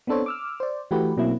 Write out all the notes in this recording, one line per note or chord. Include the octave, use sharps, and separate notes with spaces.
B3 C4 D4 A4 C5 C#5
D6 E6 F6
C5 D5
E3 A3 F#4 G4 B4
B2 F#3 A#3 C4 E4